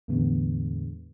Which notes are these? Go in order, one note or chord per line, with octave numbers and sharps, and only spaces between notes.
E2 A2 D3 G#3 B3